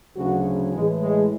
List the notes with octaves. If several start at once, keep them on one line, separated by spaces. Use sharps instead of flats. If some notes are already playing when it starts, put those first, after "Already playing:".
D2 C#3 F#3 F#4
A2 E3 G#3
G#3